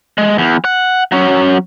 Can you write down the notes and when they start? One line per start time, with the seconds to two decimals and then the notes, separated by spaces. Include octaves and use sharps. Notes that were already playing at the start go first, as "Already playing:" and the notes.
0.18 G#3
0.38 E2
0.65 F#5
1.12 F#3 C#4